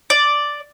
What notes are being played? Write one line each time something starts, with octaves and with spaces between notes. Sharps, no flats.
D5